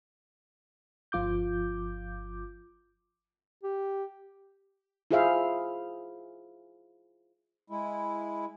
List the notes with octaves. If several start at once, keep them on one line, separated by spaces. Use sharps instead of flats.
G1 F3 F4 D6 G6
G4
E4 F4 G#4 C5 E5 F5
G#3 E4